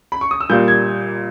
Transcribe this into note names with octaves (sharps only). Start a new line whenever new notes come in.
B5
C#6
D#6
E6
A#2 G3 A#3 G6
G#6